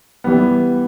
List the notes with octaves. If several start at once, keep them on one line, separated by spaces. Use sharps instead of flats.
E3 G3 B3